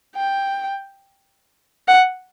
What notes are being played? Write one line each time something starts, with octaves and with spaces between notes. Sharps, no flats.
G5
F#5